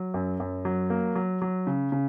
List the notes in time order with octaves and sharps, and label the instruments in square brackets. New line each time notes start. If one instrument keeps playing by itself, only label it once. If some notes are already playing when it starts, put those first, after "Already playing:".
Already playing: [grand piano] F#3
F#2
F#2
F#3
A#3
F#3
F#3
C#3
C#3